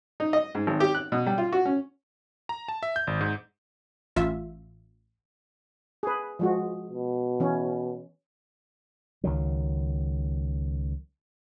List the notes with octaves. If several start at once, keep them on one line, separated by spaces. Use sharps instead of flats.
D#4
D#5
G#2
G#1
G4
F#6
B2
G3
F4
F#4
C#4
A#5
A5
E5
G6
G#1
G#2
A1 F4 E5
G#4 B4
F3 G#3 F#4
B2
E3 C#4
C#2 D#3 F#3